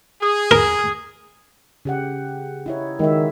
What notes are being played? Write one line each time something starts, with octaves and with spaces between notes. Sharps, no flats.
G#4
A#4
C#3 G4 F#5
D#4 E4 C#5
D#3 G#3 F#4 E5